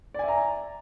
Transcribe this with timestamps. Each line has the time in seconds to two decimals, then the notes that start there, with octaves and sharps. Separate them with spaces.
0.14 D5
0.19 G#5
0.24 E5
0.28 A#5